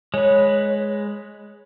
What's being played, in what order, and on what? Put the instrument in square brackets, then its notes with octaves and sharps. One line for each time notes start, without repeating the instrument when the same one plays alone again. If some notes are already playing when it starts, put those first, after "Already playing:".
[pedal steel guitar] G#3 B4 [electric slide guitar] C#5